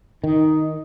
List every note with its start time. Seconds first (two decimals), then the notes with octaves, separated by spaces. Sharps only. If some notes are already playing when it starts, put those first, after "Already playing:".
0.24 D#3 D#4